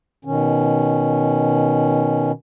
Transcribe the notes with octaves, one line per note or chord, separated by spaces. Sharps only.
B2 D#3 C#4